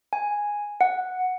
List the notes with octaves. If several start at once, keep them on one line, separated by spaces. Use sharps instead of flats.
G#5
F#5